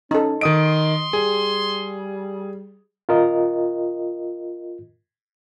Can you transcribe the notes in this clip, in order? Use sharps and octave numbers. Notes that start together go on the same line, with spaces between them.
C#4 D#4 A4
D#3 D#5 C6 D#6 D7
G3 G#4
F4 A#4 D#5